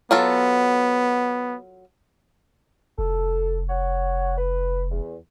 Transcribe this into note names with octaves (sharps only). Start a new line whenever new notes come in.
F#3 B3 F4 A4
F1 A4
C#5 F#5
B4
E2